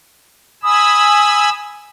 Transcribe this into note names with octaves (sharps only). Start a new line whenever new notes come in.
G#5 B5 D#6 E6